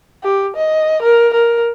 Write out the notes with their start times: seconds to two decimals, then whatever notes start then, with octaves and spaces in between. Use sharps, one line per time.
0.23 G4
0.56 D#5
1.02 A#4
1.33 A#4